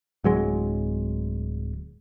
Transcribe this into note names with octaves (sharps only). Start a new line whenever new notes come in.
D1 F#3 G#3